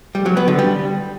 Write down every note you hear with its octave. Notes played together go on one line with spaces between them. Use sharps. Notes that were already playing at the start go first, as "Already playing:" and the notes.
G3
F#3
B3
D3
G3